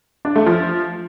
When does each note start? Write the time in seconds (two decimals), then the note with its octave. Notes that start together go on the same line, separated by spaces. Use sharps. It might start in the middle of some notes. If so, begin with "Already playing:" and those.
0.25 D4
0.36 A3
0.46 F3